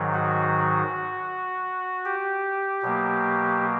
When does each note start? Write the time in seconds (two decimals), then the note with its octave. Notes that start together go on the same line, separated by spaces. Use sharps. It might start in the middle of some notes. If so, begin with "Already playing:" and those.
Already playing: G#2 D#3 F#3
0.14 F#4
2.05 G4
2.82 B2 F#3 A#3